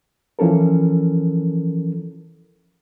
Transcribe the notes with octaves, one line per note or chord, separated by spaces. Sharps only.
E3 F3 C#4 A4 A#4